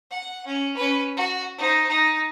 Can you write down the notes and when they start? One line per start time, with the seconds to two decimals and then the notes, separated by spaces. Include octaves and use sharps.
0.11 F#5
0.46 C#4
0.77 C#4 B4
1.17 F#4
1.58 D#4 C5
1.89 D#4